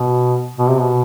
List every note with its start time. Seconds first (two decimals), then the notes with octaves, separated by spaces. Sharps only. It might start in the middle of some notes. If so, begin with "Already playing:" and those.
Already playing: B2
0.58 B2
0.70 C3
0.81 B2